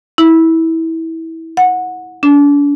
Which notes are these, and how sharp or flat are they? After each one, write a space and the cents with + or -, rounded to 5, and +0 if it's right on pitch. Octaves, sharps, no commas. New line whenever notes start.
E4 -20
F#5 -20
D4 -40